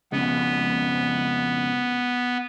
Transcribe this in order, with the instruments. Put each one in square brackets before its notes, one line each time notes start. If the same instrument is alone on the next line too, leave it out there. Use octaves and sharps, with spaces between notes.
[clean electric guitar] F2 C#3 G#3 [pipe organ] B3